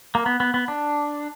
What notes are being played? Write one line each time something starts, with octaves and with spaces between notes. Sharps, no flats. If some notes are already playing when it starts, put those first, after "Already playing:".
A#3
B3
B3
B3
D4